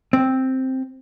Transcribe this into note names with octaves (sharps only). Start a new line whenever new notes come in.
C4